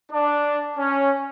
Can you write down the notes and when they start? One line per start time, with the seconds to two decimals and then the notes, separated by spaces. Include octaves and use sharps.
0.12 D4
0.77 C#4